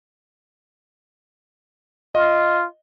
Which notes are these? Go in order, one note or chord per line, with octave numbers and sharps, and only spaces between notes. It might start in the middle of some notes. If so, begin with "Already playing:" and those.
F4 D#5